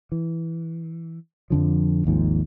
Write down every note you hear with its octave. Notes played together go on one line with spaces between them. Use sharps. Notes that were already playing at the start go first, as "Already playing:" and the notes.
E3
F2 D3 F3
G#1 D#2 G#2 F3